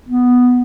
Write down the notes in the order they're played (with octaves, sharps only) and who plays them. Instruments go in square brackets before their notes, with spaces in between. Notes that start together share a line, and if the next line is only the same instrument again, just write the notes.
[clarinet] B3